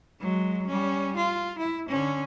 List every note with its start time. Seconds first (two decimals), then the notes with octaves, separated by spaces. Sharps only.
0.21 F#3 G#3
0.67 G3 C#4
1.16 F4
1.58 E4
1.89 D3 C#4